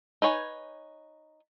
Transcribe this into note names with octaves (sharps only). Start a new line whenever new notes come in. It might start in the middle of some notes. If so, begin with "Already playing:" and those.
D#4 B4 C#5 G#5